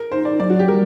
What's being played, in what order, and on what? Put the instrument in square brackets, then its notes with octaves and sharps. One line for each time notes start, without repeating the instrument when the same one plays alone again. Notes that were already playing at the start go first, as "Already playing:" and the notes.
Already playing: [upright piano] A#4
[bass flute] D#4 [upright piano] C5
[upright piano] D5
[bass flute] F#3 [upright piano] D5
[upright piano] F#4
G4
[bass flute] G3 [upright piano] A#4